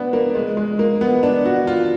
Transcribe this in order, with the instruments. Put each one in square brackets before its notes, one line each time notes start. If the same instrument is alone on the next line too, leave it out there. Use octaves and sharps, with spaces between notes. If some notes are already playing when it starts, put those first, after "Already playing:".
Already playing: [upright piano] B3 D4
A#3
G#3
G#3
A#3
B3
D4
F#4
F4